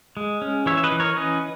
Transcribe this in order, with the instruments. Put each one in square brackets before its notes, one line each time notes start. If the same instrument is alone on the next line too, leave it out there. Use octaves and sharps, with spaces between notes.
[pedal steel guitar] G#3
C#4
E3 C#5 E5
E5
B4 D#5
E3
A#4 C#5
C#4 B4 D#5